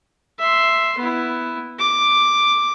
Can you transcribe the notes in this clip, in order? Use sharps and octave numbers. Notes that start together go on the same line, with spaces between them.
E5 C6
B3 E4
D6